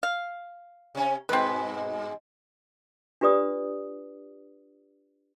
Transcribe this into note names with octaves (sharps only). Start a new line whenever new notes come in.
F5
C3 C#4
G2 B2 G#3 C4 B4
D4 F4 G4 B4 D5 D#6